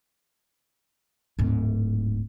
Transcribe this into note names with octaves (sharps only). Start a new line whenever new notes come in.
D1 G#2